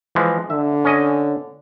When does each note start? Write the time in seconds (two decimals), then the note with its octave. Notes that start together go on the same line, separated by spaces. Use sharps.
0.15 E3 F3 G#3
0.50 D3 E5
0.85 C#4 D#5 G#5